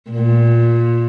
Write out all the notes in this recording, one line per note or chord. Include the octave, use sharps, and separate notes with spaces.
A#2